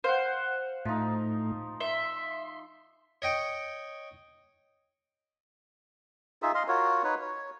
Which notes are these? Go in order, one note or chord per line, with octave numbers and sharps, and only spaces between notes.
C5 F5 F#5
A2 F3 A3 D#4
E5 C6
C#5 D#5 G5 C#6
D#4 F4 G#4 E5
D#5 F5 C6
F4 F#4 A#4 C#5
D#4 B4 C#5
C#5